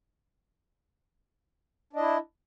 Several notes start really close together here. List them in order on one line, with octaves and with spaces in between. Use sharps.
D4 D#5 E4